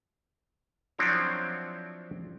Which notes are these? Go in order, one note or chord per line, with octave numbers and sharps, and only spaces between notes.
F3 F#3 C4 D4 E4 C#5